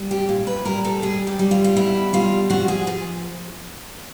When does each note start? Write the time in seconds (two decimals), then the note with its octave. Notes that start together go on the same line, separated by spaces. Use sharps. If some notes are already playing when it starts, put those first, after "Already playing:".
Already playing: G3
0.11 G4
0.29 A#2
0.47 B4
0.65 G3 A#4
0.85 A4
1.02 G3 G#4
1.27 G4
1.39 G3
1.51 F4
1.64 F4
1.76 B2 E4
2.13 G3 F4
2.50 F3 F#4
2.68 G#4
2.87 F3 G#4